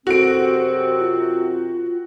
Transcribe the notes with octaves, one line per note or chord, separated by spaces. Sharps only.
F#2 C3 C4 F#4 A4 D7
F4